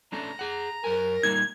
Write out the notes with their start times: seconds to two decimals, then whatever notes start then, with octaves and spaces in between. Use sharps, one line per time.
0.12 A3 C#4 D4 A#5
0.39 G#4 F#5
0.84 F#2 A#4 G#5
1.23 G3 A#3 D#4 G#6